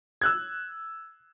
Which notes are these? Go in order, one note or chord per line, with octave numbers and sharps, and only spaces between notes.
E6 F#6 G#6